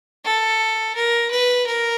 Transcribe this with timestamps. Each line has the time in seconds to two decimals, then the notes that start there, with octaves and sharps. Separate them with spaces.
0.25 A4
0.96 A#4
1.31 B4
1.67 A#4